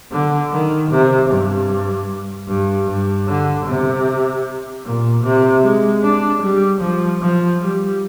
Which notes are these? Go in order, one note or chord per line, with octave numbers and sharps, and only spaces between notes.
D3
D#3
C3
G2
G2
G2
D3
C3
A#2
C3
G#3
D4
G3
F3
F3
G3